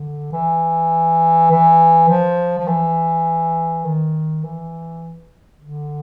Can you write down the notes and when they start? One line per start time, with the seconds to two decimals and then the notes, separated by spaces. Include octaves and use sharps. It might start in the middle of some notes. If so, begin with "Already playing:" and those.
Already playing: D3
0.33 E3
1.51 E3
2.09 F3
2.58 F3
2.68 E3
3.85 D#3
4.44 E3
5.61 D3